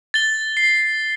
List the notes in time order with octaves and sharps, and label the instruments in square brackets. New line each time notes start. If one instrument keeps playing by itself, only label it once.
[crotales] A6 G7
C7